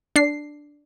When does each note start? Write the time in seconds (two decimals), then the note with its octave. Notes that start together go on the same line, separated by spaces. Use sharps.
0.16 D4 C7